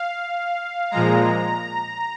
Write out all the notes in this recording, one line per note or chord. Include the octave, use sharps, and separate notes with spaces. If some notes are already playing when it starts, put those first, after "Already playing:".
Already playing: F5
A#2 F3 G#3 A#5